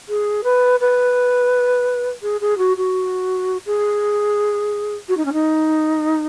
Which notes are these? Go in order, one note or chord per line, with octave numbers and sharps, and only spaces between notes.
G#4
B4
B4
G#4
G#4
F#4
F#4
G#4
F#4
D#4
C#4
D#4